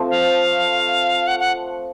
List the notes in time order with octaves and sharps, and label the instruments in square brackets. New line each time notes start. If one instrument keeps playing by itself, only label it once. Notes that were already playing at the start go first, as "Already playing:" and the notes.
Already playing: [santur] F3 A3 C4
[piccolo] F5
F#5
F#5